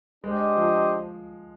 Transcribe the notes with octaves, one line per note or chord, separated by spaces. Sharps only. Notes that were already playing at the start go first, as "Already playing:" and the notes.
G#3 D4 G4 C5 D#5
F3